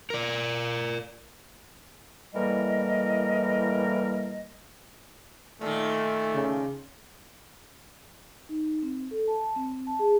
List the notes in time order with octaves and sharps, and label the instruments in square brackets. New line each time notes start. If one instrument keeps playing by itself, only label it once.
[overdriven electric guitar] A#4 D5
[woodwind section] A2 E3 G3 A#3 A#4 D#5
[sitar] A#2 D#3 [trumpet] A3
[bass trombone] C#3
[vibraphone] D#4
C4
A4
A5
C4
C4
A5
G#4